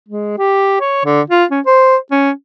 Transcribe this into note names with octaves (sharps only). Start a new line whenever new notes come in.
G#3
G4
C#5
D3
F4
C#4
C5
C#4